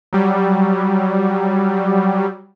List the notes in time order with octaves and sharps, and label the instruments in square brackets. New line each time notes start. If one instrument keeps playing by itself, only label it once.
[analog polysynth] F#3 G3